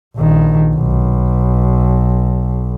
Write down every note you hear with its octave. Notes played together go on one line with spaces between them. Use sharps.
A#1 D#3
B1